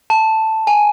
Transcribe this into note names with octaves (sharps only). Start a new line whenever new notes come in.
A5
G#5